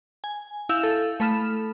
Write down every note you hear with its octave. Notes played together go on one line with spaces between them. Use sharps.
G#5
E4 F5 E6 G6 E7
A4
A3 A4 B5 F6 E7